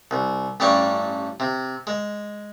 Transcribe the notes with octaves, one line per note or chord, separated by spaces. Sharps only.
C2
A1 G2 G3 C#4 D5 C#6
C3
G#3